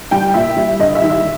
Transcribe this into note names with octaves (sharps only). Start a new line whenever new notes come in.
G3 G5
A#2 E5
G3
G2 D#5
E5
D#3 G3
E5